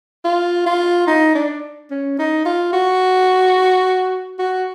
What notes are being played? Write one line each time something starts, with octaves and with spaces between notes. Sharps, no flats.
F4
F4
D#4
D4
C#4
D#4
F4
F#4
F#4